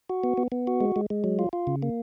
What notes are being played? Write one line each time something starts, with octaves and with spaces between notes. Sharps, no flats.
F#4
B3
B3
B3
F#4
G#3
G#3
G#3
F#3
F4
F4
C#3
A#3